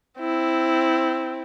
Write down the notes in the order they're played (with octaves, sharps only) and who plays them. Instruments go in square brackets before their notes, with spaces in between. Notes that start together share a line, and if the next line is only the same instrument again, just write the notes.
[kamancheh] C4 E4